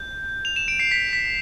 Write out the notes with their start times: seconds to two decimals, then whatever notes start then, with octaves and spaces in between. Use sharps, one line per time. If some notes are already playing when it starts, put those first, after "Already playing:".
Already playing: G6
0.45 F7
0.56 E7
0.68 D7
0.79 C7
0.91 B6
1.13 B6